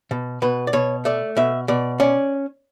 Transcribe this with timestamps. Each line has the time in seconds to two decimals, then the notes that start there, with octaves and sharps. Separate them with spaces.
0.11 B2
0.42 B2 B4
0.67 D5
0.73 B2 C#5
1.05 A3 D5
1.37 B2 E5
1.68 B2 D5
2.00 C#4 D5